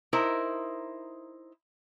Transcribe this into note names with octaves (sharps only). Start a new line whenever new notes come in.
D#4 E4 A#4 C5